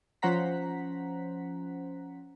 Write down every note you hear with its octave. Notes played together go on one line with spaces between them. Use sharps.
F3 C#4 C5 F#5 A#5 B6